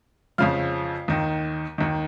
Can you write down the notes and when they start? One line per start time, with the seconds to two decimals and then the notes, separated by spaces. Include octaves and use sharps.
0.38 F2 C#3 F3 F5 F6
1.08 D#2 D#3
1.78 D#2 D#3